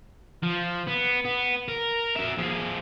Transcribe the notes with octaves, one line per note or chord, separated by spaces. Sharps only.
F3
B3
B3
A#4
F#4 E5
F3 G#4